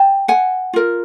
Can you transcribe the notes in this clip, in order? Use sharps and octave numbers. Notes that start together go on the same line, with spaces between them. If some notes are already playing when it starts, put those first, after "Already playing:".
Already playing: G5 A5
F#5 G#5
F4 A#4